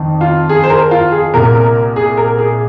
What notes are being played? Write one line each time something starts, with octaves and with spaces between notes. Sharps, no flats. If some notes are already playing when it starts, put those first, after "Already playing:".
Already playing: F2 D#3
F4
G#4
C5
A#4
F4
G#4
C2 A#2 A#4
A#4
G#4
A#4
G#4